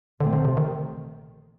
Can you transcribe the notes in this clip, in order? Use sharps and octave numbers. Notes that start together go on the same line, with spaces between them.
A#1 A#2 D3 A3 C4
D3
C3
D#3